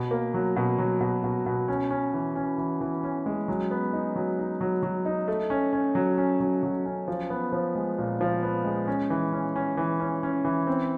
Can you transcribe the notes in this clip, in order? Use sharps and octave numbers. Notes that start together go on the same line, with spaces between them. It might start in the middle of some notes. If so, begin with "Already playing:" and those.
Already playing: B2
A#3
F#3
B2
F#3
B2
B2
B2
C#4
C#4
E3
C#4
E3
E3
C#4
G#3
F#3
B3
D#4
F#3
D#4
F#3
F#3
D#4
A3
C#4
C#4
F#3
C#4
F#3
F#3
C#4
F3
B3
F3
G#3
A#2
F3
B3
G#3
C#4
E3
C#4
C#4
E3
C#4
C#4
E3
C4